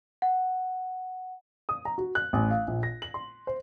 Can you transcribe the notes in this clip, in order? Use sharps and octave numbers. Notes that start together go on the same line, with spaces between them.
F#5
D#6
A#5
F#4
F#6
A1
F5
A#1
A#6
F#7
C6
C5